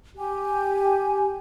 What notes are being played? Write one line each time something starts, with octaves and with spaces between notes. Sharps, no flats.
G4 G#5